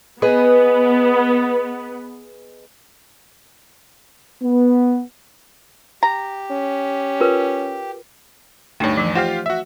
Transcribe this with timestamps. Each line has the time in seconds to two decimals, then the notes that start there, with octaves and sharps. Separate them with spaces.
0.22 B3 G#4 B4 D#5
4.43 B3
6.03 G4 A#5
6.51 C#4
7.21 F4 A#4 B4
8.80 D2 G2 A3 D#4 C#5
8.97 E3 F3
9.15 F4 G4 C5 F5 F#5
9.46 F#4 E5